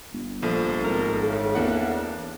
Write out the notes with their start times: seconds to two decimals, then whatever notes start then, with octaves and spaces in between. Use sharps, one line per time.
0.13 G1
0.42 A#1 F3 A4
0.84 G#1 A#4
1.27 A2 C#3
1.55 E2 A#3 D4 F#5